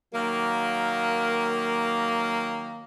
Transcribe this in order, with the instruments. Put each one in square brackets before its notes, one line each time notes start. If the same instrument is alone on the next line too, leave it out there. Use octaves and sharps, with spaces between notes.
[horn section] D#3 F#3 A#3